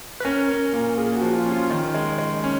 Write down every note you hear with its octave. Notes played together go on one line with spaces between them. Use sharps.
B4
C#4 A#4
C#4
A#2
A#2 G#4
F#4
F3
F4
C#4
F4
D#3
G#3
G#3
C#4